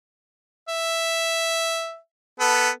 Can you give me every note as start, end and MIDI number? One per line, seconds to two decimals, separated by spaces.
0.68 1.97 76
2.40 2.70 59
2.40 2.70 69